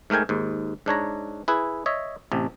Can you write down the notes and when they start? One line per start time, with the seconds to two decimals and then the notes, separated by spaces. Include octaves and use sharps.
0.10 G#2 A3 A#4 G5 G#5
0.29 D#2 G#2
0.86 G#2 D4 C#5 A#5
1.48 E4 G#4 B4
1.86 C#5 D#5 E5
2.32 A1 C3